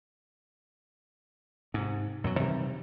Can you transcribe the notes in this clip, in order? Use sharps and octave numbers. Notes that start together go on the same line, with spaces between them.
G#2 C3
F#2 B2 F#3
C3 D#3 E3 G3